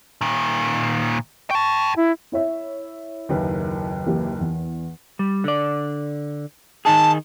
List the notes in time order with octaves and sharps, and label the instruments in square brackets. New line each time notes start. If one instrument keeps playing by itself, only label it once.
[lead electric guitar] A#2 D#3
[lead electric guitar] G5 A5 [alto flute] C#6
[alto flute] E4
[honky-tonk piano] E4 C#5 E5
[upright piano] F#1 D#2 B4
[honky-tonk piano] E3 A#3 G4
E2
[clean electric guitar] G3
D3 D5
[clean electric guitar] D#3 D#4 G#4 [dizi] A5